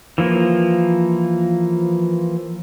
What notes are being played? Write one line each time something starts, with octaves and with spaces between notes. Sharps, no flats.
E3 F3 A#3